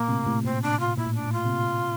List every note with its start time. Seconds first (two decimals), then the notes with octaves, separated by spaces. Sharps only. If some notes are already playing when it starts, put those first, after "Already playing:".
Already playing: A#2 A#3
0.08 A2 C3
0.27 A2 C3
0.45 A#2 C4
0.62 D4
0.80 F4
0.97 A#2 E4
1.07 A2
1.14 D4
1.25 A2
1.33 F4
1.45 C3
1.50 A#2